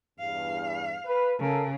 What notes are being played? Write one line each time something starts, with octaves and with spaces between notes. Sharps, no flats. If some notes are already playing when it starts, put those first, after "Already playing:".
E2 G2 F5
B4
C#3 A4 A#4